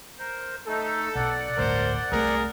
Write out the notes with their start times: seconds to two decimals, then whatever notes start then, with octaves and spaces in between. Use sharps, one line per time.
0.19 A#4 C5
0.67 A3 D#4 A4
1.15 B1 B2 D5 F#5
1.57 G1 D2 A2 A#4 C5
2.12 C2 E3 A3 G#4 A#4